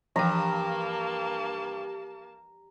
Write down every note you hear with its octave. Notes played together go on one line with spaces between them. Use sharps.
G2 E3 F3 A#3 G5 A5 A#5